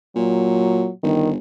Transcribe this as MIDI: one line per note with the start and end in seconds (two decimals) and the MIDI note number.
0.16 0.88 46
0.16 0.91 54
1.03 1.37 31
1.03 1.29 51